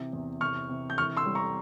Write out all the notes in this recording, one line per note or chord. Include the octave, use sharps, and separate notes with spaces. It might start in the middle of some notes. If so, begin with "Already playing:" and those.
Already playing: C3 E3
E2
C3 C#6 F6
C3
G6
E3 C#6 F6
C6 E6
G3
A#5 C#6